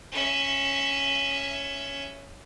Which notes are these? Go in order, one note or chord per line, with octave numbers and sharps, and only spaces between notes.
C#4 E5